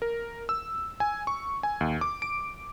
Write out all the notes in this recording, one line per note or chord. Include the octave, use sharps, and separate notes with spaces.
A#4
E6
G#5
C#6
G#5
D#2
D6
D7